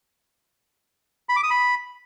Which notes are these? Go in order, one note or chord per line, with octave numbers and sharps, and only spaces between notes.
B5
D6
D#6
B5